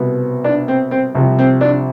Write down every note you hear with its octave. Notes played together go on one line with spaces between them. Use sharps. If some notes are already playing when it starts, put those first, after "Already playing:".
Already playing: C2 B2 B3
D4
C4
C4
C2 C3 F3
C4
D4